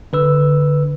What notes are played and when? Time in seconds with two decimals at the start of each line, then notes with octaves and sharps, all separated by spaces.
0.13 D3 B4 E6